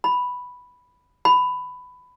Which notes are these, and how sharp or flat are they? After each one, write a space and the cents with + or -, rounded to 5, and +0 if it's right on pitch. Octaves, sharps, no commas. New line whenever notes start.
B5 +0
B5 +15